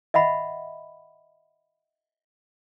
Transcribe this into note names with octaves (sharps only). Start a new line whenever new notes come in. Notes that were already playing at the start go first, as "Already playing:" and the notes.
D#5 E5 F#5 B5